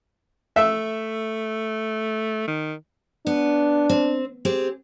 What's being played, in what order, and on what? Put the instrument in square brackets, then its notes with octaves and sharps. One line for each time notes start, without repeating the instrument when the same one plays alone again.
[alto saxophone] A3 [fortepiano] E5
[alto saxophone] D#3
[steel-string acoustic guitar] B3 [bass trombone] D4
[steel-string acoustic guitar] C4
C4 G4 G#4